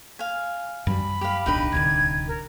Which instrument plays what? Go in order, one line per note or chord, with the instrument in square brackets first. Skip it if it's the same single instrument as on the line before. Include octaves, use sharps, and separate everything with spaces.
[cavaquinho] F5 G#5
[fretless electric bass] F#2 F#3 G3 [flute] B5
[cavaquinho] G4 F5
[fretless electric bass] D1 B1 D4 [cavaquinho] D#4 G4 B4
[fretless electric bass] D1 C2 D3 [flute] G#6
[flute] A#4